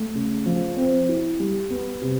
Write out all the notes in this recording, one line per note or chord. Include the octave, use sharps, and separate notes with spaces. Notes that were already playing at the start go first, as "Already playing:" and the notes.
Already playing: A3
C#3
F3
C4
E4
G3
B3
C3